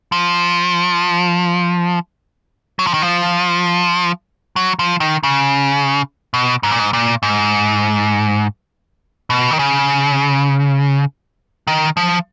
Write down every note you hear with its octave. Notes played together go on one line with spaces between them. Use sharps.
F3
F#3
F3
D#3
F3
F#3
F3
D#3
C#3
B2
G#2
A#2
G#2
A#2
G#2
B2
D#3
C#3
D#3
F3